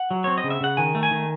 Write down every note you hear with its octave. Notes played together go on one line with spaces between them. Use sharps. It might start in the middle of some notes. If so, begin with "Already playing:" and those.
Already playing: F#5
F#3
C4 C#5
D#5
C#3
E5
C#3 F#5
D#3 G#5
A3
G#5
D#3